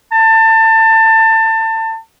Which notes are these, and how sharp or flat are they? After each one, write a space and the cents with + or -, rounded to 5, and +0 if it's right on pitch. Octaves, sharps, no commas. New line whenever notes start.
A5 +25